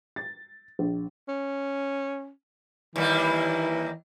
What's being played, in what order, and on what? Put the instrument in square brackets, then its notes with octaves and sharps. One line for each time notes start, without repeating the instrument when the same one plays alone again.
[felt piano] A6
A#1
[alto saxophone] C#4
[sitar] D#2 G3 A#3 [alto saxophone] E3